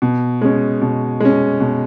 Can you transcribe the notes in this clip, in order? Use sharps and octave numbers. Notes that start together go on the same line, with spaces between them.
B2
G#3 C#4
B2
G#3 C#4
B2